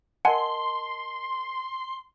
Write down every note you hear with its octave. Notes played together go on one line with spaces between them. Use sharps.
A#4 D#5 F#5 G#5 A5 C6